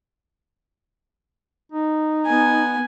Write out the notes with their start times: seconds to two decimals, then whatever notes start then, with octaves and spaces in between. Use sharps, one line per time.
1.72 D#4
2.26 B3 G#5